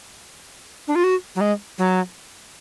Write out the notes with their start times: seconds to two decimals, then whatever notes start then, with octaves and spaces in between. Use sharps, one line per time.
0.88 D4
0.95 F4
1.04 F#4
1.35 F#3
1.41 G#3
1.78 F#3